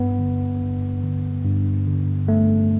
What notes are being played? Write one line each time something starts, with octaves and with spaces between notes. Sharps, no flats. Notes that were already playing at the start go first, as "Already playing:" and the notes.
Already playing: G2 B3
D3
G2
D3
G2
D3
G2 A3